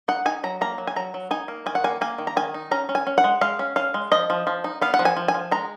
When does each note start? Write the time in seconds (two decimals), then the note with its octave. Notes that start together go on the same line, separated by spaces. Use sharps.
0.08 D#4 F#5
0.25 D#4 G#5
0.43 F#3 A#5
0.61 A#3 A#5
0.78 F#3
0.87 G#5
0.96 F#3 A#5
1.14 F#3
1.31 D#4 G#5
1.48 A#3
1.66 D#3 G#5
1.75 F#5
1.84 A#3 G#5
2.01 A#3 G#5
2.18 D#3
2.27 A#5
2.37 D#3 G#5
2.54 D#4
2.71 C#4 A#5
2.89 C#4
2.95 G#5
3.07 C#4
3.18 F#5
3.24 G#3
3.41 G#3 F5
3.59 C#4
3.76 C#4 F5
3.94 G#3
4.12 F3 D#5
4.30 F3
4.47 F3
4.64 D#4
4.81 B3 F5
4.94 F#5
4.99 F3
5.05 G#5
5.17 F3
5.28 G#5
5.34 F3
5.51 G#3 A#5